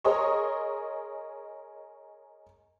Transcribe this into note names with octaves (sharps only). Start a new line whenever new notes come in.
G#4 A#4 C#5 D#5 C6 C#6